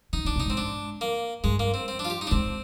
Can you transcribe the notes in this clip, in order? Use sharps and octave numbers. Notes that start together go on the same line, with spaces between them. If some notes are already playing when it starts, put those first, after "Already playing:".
D3 D#4
D3 D4
C3
D#4
G#2 C4
D4
A#3
G2 G#3
A#3
C4
C4
D4
F4
G4
D#4
D4
G#2 C4